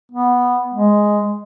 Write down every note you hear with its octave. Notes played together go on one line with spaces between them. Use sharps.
B3
G#3